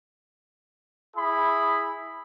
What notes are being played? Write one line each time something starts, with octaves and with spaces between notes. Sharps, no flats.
E4 G#4 B5